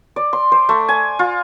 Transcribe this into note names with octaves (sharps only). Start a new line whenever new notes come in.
D5
C6
C5
A3
G#5
F4